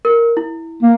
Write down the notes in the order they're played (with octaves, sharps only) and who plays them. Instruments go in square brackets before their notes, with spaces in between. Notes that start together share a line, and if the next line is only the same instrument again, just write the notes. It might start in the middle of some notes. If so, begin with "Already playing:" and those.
[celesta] A#4
E4
[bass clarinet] A#3